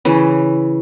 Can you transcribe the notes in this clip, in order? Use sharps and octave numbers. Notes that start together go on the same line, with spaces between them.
C#3 E3